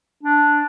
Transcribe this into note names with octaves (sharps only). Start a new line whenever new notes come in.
D4